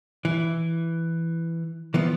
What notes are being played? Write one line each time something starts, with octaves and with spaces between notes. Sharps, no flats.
E3
E3 F3 B3